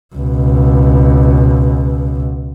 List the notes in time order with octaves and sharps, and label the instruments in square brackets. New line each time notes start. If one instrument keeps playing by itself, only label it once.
[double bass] C#2 B2